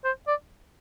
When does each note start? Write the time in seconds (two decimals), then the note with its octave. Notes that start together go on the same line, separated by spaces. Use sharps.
0.04 C5
0.27 D5